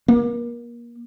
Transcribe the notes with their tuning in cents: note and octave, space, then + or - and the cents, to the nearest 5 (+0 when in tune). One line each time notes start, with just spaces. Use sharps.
A#3 +30